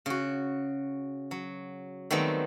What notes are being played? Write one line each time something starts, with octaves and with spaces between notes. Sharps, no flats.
C#3 F#4
F#3
D#3 F#3 G3 A3 B3 C4